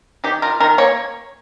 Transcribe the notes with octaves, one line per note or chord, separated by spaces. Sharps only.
D#3 G4
F4 A#4
D#3 A#4
A#3 C#5